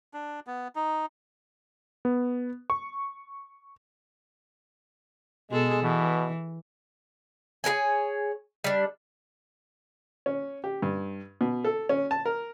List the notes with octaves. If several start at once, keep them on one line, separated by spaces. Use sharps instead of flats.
D4
B3
D#4
B3
C#6
B2 G#3 G#4 A4
B2 E3
G#4 A#4 C#5 G#5
G3 D4
C#4
G4
G2
B2
A4
C#4
A5
A#4